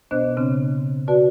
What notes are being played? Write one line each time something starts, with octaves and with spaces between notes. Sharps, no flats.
B2 B3 D4 C5 D#5 F#6
C#3 C4 D4
F#4 B4 D5 A5